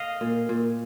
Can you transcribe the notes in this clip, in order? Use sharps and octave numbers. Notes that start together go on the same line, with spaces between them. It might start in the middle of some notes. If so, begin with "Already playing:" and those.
Already playing: D#5 F5
A#2
A#2